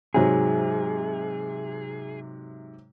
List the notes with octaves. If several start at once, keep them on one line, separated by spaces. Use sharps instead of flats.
G#2 C3 F#3 G#4